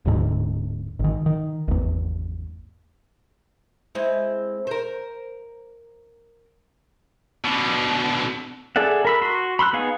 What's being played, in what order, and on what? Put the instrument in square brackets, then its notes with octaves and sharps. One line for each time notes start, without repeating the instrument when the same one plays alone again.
[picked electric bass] D1 D2 G#2 D3
G#1 D#3
D#3
G#1 E2
[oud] G#3 C4 E4
A#4 C5
[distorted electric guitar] B2 D3
[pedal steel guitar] G#4 A4 D5 E5 F#5
A#4 B5 E6
F#4 C6
B5 C6 E6 F#6
B3 D#4 G#4 F5